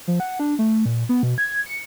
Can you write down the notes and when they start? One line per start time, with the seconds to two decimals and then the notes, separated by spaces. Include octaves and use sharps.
0.08 F3
0.20 F#5
0.40 D4
0.59 A3
0.86 A#2
1.09 B3
1.23 B2
1.38 G#6
1.66 C#7